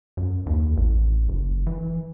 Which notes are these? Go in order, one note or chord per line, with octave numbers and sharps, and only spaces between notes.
F#2
D#2
A1
F#1
E3